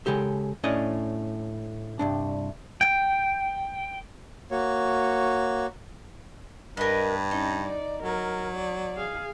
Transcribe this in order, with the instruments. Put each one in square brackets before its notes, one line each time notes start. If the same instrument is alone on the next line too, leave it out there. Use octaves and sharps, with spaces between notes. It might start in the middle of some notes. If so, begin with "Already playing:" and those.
[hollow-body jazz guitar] C#3 G#3 G4 A4
A2 C#4 D4 D5 D#5
C2 G2 D4
[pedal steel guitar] G5
[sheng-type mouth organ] A#3 F#4 C#5
[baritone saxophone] G2 [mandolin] A#4 D#5 [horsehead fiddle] B4
[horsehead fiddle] C#4 [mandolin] D#4
[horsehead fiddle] D5
[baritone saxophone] F#3 [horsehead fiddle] A#4
[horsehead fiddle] D5
G#4 F5